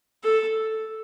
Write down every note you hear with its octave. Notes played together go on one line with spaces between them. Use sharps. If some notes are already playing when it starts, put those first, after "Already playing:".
A4